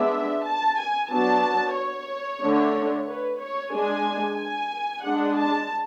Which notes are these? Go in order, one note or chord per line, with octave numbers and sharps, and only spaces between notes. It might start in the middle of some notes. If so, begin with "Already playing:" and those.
Already playing: G#3 B3 D4 E5
A5
G#5
F#3 B3 D4 A5
C#5
D3 A3 D4
B4
C#5
G#3 D4 G#5
G#5
G#3 D4 F#5
A5